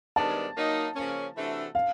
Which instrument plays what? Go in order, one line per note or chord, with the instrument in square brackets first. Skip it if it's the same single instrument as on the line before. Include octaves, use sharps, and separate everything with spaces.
[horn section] G#2 D#3 G3 B3 D4 [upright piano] A5
[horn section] F#3 A#3 D#4
C#3 F3 A#3 C#4
C3 E3 A3 D4 F#4
[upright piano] F5